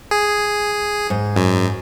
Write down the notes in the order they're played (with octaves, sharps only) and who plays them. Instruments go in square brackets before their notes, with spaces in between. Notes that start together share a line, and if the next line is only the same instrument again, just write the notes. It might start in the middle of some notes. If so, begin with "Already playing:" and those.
[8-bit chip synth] G#4
[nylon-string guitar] G#2
[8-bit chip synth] F#2